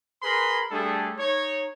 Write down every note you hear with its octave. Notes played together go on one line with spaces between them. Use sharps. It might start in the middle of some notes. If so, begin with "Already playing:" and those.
G#4 A#4 B4 B5 C6
G3 A3 D4 G#4 A4
D#4 C#5